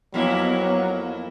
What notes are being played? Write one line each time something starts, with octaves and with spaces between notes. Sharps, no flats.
F2 F#3 A#3 B3 E4